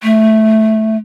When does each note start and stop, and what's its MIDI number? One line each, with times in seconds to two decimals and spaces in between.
0.03 0.97 57